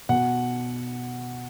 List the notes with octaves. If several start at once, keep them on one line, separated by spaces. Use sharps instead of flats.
B2 F#5